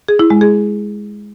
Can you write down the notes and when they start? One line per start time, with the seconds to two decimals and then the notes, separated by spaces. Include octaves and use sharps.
0.08 G#4
0.19 E4
0.30 G#3
0.41 G#4